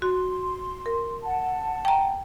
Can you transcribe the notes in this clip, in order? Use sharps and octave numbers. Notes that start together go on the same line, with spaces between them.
F#4 C6
A#4
F#5 A5
G5 A#5